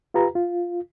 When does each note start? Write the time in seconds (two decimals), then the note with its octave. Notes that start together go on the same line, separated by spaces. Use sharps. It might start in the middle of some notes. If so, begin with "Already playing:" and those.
0.14 F4 G4 B4 A#5
0.35 F4